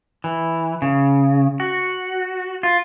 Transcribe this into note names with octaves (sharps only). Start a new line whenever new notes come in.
E3
C#3
F#4
F4